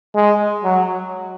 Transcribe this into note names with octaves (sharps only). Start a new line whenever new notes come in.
G#3
F#3